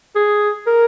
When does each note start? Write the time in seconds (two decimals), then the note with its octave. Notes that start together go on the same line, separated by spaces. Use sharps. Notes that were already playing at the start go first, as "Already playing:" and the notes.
0.15 G#4
0.66 A#4